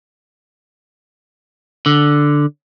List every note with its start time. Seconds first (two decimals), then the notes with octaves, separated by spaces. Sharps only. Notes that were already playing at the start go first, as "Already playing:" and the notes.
1.86 D3